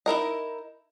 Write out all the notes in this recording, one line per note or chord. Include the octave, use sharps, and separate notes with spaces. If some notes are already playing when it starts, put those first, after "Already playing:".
D#4 E4 A#4 D#5